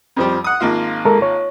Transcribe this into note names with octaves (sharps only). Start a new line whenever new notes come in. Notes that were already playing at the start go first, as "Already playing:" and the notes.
F2 F3 G3
F#5 D#6
G#1 A#3 F4
G#3 A4 A#4
C#5